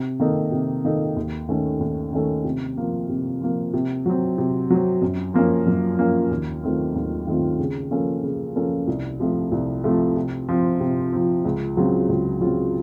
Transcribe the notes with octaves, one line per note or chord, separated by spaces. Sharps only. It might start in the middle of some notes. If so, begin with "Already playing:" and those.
Already playing: C3
D#3 A#3 D#4 A4
C3
D#3 A#3 D#4 A4
D#2
D#3 A3 C#4 A4
D#2
D#3 A3 C#4 A4
C3
F3 A#3
C3
F3 A#3
C3
F#3 C4
C3
F#3 C4
F#2
F3 A#3 C#4
F#2
F3 A#3 C#4
D#2
D#3 A3 C4 F4
D#2
D#3 A3 C4 F4
C#3
F3 A#3 C#4 A4
C#3
F3 A#3 C#4 A4
C2
C3 F3 A3
C2
C3 F3 A3
C3
F3 C4
C3
F3 C4
C#2
C#3 F#3 C4 F4
C#2
C#3 F#3 C4 F4